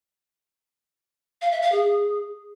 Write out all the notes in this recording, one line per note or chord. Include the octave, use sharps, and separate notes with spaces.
F5
E5
F5
G#4